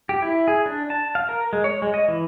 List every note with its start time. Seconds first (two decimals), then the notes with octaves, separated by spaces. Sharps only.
0.09 G4
0.22 E4
0.48 G#4
0.66 D4
0.90 A5
1.15 F5
1.29 A#4
1.53 G#3
1.64 C#5
1.82 G#3
1.94 D#5
2.08 E3